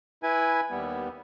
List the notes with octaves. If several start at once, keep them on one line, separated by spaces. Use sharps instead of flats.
E4 B4 G#5
D#2 G3 B3